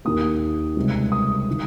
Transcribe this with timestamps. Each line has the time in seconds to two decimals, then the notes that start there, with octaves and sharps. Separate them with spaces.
0.05 D#2 D#3 A#3 D#6
0.76 C#2 C3 G3
1.12 D#6
1.51 D#3